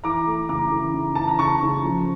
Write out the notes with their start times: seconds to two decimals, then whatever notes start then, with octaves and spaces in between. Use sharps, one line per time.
0.04 E3 A#5 D6
0.27 A3
0.49 C#3 A#5 D6
0.72 E3
0.94 C#3
1.15 E3 A5
1.28 A#5
1.39 C#3 A5 C#6
1.62 C#3
1.84 F3